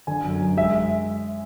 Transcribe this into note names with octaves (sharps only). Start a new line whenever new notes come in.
D3 G#5
F#2
F#2
G#3 E5